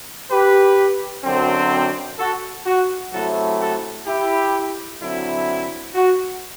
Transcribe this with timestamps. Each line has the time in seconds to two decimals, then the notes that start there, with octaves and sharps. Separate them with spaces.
0.31 G4 B4
1.25 F#2 D3 F#3 C4
2.19 F#4 A4
2.66 F#4
3.13 C3 F#3 A3 E4 F#4 A4
3.60 F#4 A4
4.07 E4 G4
5.01 D3 F#3 C4 E4
5.95 F#4